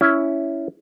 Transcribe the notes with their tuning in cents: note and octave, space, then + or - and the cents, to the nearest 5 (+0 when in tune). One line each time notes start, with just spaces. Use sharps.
C#4 +15 E4 +0